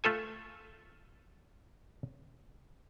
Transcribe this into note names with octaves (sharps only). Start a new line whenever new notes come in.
A3 F4 A4 G#5